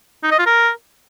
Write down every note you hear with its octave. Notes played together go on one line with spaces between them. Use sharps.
D#4
D#5
F4
A#4